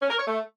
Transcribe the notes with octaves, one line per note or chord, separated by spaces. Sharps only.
C#4
A#4
C#5
A3